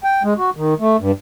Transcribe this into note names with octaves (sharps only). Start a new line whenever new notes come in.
G5
G#3
F#4
D#3
A3
G2